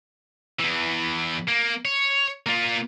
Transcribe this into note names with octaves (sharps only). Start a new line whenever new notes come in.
E2 E3
A#3
C#5
A#3 F4